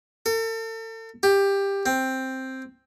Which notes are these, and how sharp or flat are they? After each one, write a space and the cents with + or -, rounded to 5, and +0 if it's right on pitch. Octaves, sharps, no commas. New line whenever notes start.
A4 +40
G4 +15
C4 +5